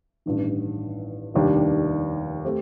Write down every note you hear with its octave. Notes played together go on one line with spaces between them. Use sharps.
A1 G2 D#3
F1 D#2 D#3 G3 D4
A3 C4 G4 C5